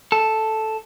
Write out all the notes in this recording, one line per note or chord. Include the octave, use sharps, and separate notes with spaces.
A4